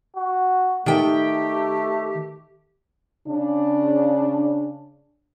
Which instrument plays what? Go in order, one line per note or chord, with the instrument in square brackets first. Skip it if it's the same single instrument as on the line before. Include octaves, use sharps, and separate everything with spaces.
[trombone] F#4
[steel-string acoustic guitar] D#3 G5 [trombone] A3 [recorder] G4
[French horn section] C#3 D4